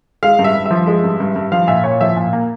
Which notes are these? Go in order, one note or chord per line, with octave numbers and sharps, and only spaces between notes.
G#3 F5
G2
E5
G2
E5
F3
G#3
G2
G2
G2
F3 F5
A#2 E5
A#2 C#5
F3 E5
A#2
A#3